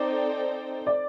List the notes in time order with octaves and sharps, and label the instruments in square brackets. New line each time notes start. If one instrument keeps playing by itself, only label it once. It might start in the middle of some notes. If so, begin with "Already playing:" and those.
Already playing: [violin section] C4 D#4 A4 C5 G5 [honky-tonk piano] D5
[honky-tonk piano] D5